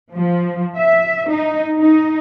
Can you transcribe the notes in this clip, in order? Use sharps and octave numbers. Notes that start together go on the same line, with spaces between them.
F3
E5
D#4
D#4